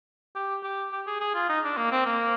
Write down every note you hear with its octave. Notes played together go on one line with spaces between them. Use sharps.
G4
G4
G4
G#4
G#4
F4
D#4
D4
A#3
C4
A#3